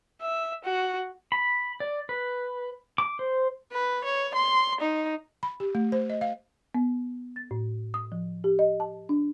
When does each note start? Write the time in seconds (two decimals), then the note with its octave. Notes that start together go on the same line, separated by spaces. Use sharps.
0.21 E5
0.64 F#4
1.32 B5
1.80 D5
2.09 B4
2.98 D6
3.19 C5
3.72 B4
4.05 C#5
4.35 C6
4.81 D#4
5.43 B5
5.60 G4
5.75 A3
5.92 C5
6.10 D#5
6.21 F5
6.75 B3
7.36 A6
7.51 A2
7.94 D#6
8.12 F3
8.44 G4
8.59 D#5
8.80 A5
9.09 D4